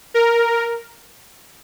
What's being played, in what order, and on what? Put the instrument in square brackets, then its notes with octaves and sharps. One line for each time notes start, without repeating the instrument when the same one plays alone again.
[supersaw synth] A#4